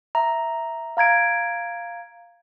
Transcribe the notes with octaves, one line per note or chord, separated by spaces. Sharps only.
E5 A#5
F5 A#5 G#6 D7